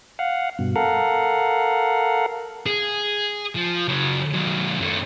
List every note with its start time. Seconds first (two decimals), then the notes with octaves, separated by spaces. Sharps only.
0.19 F5 F#5
0.59 G2 B2
0.76 A4 A#4 F5 F#5
2.66 G#4
3.55 F3
3.88 C#3 F#3
4.34 D#3 F#3
4.80 F#2 A3